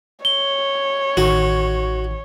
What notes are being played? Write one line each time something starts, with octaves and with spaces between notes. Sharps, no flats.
C#5 G7
A1 D#3 F#4